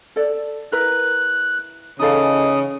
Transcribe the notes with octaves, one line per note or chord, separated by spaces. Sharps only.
A4 D5
E4 A#4 B4 F#6
C#3 E3 D#4 A4 D#5 F5 D#6